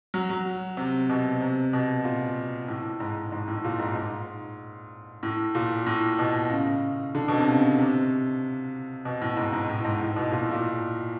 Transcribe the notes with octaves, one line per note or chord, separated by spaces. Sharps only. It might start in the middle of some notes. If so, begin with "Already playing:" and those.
F#3
F#3
C3
B2
C3
B2
A#2
A2
G#2
G#2
A2
A#2
G#2
G#2
A2
A#2
A2
B2
C#3
D3
B2
C3
C#3
C3
B2
A2
G#2
G#2
A2
G#2
A2
B2
A#2
A2
A#2